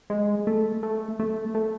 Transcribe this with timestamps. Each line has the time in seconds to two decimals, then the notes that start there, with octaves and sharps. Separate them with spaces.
0.10 G#3
0.47 A3
0.83 A3
1.19 A3
1.55 A3